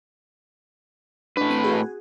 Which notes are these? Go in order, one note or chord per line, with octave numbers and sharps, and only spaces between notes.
A2 D4 B4
C4 B5 D#7
F#4 G#4